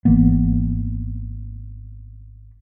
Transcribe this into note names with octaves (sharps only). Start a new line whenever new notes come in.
G#1 E3 A#3 B3